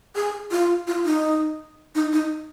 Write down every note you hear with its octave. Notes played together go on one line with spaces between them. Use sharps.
G#4
F4
F4
D#4
D#4
D#4